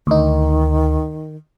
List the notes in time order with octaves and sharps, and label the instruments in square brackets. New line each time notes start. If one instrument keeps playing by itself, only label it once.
[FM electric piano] D2 D#4 [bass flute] D#3